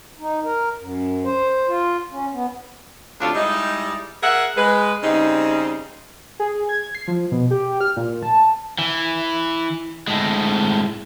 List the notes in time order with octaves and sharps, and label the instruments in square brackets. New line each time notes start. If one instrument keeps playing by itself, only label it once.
[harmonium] D#4
A#4
F#2
C5
F4
C#4
B3
[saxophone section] D2 C3 D4 F4 A4 C#5
G3 G#3 D#4 E4 D#5
G#4 A#4 E5 F#5
G#3 B4
C#3 G3 C4 D#4
[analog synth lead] G#4
G#6
C7
F3
B2
G4
F6
A#2
A5
[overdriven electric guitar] E3
A2 G#3